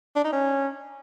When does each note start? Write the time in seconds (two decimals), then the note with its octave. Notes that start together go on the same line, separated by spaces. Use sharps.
0.16 D4
0.24 D#4
0.33 C#4